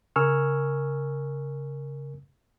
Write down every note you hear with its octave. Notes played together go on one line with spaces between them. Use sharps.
C#3 A#4 G#5 C#6 E6 F6